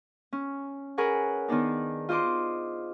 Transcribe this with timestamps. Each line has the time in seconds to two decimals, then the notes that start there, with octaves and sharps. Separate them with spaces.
0.33 C#4
0.98 G#4 A#4 B4 C#5 F#5
1.48 D#3 B3 D4 D#4
2.09 F4 C5 D#5 C6 D6